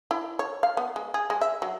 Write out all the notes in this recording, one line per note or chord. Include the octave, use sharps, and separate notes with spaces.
E4
C#5
F5
B3
G#3
G#4
G#3
E5
F#3